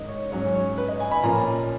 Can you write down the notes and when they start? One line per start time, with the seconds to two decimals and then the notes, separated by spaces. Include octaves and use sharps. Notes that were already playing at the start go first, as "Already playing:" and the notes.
Already playing: G#2 D#3 C#4 D#5
0.09 C#5
0.31 G#2 F#3 C#4 C#5
0.55 C#5
0.78 B4
0.88 D#5
1.00 G#5
1.12 B5
1.23 A#2 F3 A#3 C#4 A#5